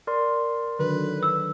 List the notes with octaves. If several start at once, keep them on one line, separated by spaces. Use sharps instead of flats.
A#4 D5 C6
D3 D#3 F#3 B4
E6